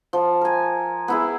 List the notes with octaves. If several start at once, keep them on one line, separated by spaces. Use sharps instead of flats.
F3
A#4 G#5
B3 E4 G#4